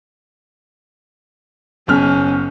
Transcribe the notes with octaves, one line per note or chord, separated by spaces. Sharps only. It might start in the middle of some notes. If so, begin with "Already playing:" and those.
F#1 B2 C#4 F6